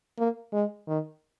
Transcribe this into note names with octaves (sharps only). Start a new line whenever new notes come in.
A#3
G#3
D#3